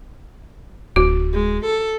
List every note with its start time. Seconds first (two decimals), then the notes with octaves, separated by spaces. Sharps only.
0.96 D1 F#4
1.33 G#3
1.66 A4